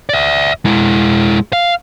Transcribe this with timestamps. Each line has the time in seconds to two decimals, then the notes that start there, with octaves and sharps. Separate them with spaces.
0.09 D5 E5
0.65 G#3 E4
1.53 F5